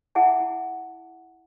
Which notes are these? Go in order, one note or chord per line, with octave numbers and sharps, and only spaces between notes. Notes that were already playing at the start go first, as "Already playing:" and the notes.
E4 G#4 E5 F#5 A5
E4